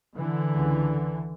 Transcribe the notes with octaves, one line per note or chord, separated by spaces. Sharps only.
D3 E3
C#2 C#3